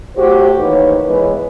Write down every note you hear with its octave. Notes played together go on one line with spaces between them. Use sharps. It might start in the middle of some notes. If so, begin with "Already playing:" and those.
A2 F#4 G4 C5
D#2 E3 D#4 B4 C#5
E3 G#3 B3 B4 C#5